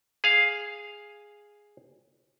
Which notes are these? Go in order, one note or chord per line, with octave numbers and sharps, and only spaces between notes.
G#4 F5